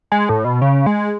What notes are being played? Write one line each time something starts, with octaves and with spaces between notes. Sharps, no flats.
G#3
A2
B2
C#3
G#3